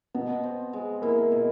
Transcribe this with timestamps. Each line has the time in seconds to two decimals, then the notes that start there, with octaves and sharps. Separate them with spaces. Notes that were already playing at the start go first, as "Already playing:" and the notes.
0.14 B2 B3
0.43 C4
0.73 G#3
1.02 A#3 E4
1.32 B2